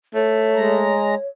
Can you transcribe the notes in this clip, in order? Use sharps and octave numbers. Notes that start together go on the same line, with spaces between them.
A3 C#5
G#3 A#5